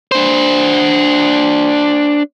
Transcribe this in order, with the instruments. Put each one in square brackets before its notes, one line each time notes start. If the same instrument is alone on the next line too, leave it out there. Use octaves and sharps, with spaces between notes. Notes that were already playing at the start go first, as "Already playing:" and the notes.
[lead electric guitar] D4 C5